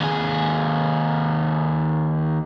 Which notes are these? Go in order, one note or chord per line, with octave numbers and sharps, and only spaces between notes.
D#2 G#4